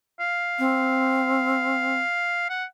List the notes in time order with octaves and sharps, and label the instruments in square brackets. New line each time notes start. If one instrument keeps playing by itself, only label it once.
[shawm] F5
[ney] C4
[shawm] F#5